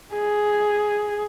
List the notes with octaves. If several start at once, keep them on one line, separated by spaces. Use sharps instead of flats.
G#4